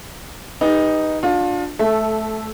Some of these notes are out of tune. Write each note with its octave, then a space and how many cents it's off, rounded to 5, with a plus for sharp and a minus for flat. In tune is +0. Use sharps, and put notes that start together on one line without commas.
D#4 +0 G4 +40 B4 -10
D4 +0 F4 +30
A3 -20 A4 +0 E5 +0